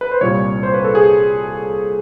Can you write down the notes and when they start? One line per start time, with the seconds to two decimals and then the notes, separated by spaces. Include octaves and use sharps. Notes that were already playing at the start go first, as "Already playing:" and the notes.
0.01 B4
0.11 C5
0.21 C2 A#2 G3 C#5
0.63 C5
0.74 B4
0.84 A4
0.95 G#4